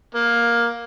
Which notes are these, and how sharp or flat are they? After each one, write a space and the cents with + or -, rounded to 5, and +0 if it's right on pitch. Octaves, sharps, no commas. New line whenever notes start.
A#3 +10